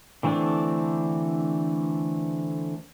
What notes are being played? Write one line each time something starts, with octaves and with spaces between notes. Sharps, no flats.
D3 E3 A3 C4 D4